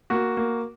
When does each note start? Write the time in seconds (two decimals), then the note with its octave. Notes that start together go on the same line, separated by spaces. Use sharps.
0.10 A#3 F#4
0.37 A#3